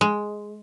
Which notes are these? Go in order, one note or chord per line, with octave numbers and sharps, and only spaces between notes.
G#3